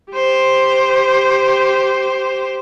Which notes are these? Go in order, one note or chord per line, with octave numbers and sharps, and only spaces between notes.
G4 C5